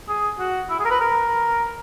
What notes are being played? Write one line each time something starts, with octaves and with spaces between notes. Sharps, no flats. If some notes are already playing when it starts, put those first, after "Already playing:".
G#4
F#4
E4
G#4
A#4
B4
A#4